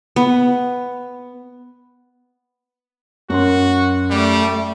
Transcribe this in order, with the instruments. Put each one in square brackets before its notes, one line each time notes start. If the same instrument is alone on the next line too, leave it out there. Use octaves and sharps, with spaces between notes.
[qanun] B3
[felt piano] F#2 A#4 C6 [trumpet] F#4
[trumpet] G3 [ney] A3